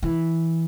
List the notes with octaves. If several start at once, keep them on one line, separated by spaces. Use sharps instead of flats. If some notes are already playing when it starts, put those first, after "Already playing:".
E3